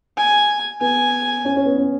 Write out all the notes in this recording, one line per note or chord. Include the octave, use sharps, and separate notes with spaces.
G#5
B3 G#5
C#4
C#4
B3
C#4